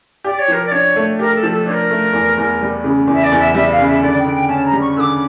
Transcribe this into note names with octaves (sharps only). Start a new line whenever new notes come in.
G4 D5
C#5
F3 A#4
D5
D4 C#5
A3
G4 A#4
A4
F3
A4
D4 C#5
A#4
A3
E2
E2
G3
C#3
E2
E5
D5
E2
E5
G3 E5
F5
C#3
E5
D3 D5
G5
D3
G5
C#4 A5
A#5
G3
C#6
D3 D6 E6